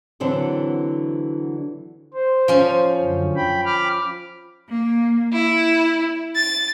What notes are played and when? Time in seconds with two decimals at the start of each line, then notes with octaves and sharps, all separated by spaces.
0.20 D3 E3 F#3 C4 D4
2.14 C5
2.48 F3 C#4
3.00 F#2 D3
3.36 G5 B5
3.65 B5 D6 F6
4.68 A#3
5.33 E4
6.34 A6